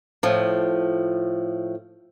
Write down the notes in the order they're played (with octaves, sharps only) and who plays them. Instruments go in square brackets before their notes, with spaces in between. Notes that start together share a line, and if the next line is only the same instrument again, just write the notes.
[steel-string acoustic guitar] A2 F3